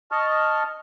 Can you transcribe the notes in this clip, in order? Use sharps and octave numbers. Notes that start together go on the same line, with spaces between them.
D#5 A5 C#6 F6